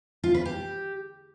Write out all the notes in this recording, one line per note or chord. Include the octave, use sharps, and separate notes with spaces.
F4
B4
G4